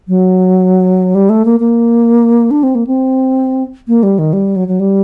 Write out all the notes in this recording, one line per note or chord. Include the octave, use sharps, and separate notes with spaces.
F#3
G3
A3
A#3
A#3
D4
C4
A#3
C4
A#3
G3
D#3
G3
F#3
F#3
G3